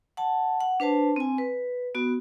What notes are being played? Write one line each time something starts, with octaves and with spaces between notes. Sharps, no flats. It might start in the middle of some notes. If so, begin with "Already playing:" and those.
F#5 A5
F#5
D4 B4 C5 A5
C4 G#5
B4
B3 F#4